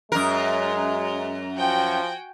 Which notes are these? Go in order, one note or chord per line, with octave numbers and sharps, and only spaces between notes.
F#2 G#3 A#4
F3 F#4 G5 G#5